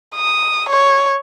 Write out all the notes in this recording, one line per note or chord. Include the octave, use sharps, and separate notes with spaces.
D#6
C#5